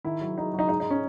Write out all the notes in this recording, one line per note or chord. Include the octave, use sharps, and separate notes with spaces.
D#3 E4
F#3
F#3 D#4
F#3 D#4
G#2 D#4
D#4
C#4